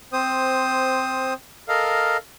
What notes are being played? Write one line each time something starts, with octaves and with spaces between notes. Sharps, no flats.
C4 C5 D#6
A4 A#4 D#5 F5